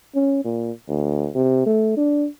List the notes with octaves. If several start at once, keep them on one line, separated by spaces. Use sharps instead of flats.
C#4
A#2
D2
C3
A3
D4